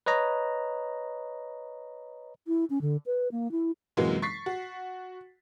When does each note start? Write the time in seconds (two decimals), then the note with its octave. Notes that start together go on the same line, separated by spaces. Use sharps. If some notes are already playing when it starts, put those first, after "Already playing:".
0.06 B4 C#5 D#5 A#5
2.47 E4
2.70 C#4
2.81 D3
3.06 B4
3.32 A#3
3.51 E4
3.97 F#2 C3 E3 F#3 G#3 A#3
4.22 C#6 A6 B6 C7
4.46 F#4